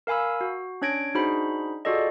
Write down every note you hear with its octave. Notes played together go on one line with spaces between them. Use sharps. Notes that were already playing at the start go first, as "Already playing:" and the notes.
A#4 F5 G#5 B5 E6
F#4
C#4 D4 C#5 G#6 A#6 D7
D4 D#4 F#4 G#4 C5 B5
F4 F#4 G#4 A4 D5 D#5